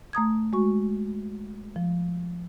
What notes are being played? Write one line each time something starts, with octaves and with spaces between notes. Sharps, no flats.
A3 A#5 D#6 G#6
G#3 F#4 C#6
F3